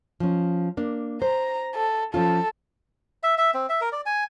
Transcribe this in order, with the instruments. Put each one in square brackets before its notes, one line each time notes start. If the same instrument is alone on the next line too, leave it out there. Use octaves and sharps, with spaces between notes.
[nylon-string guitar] F3 C#4
A#3 D4
[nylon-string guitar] C5 [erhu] A#5
[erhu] A4
[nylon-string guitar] F3 C#4 F4 [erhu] A4
[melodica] E5
E5
C4
E5
A#4
D5
G#5